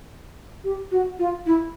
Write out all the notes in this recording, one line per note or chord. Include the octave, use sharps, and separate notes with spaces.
G4
F#4
F4
E4